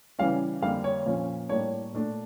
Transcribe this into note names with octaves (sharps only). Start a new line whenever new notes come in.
C#3 E3 G3 C#4 F5
F2 D3 G3 A#3 F5
C#5
A#2 F3 C#4
A2 G3 A#3 D4 C#5
A#2 A3 D4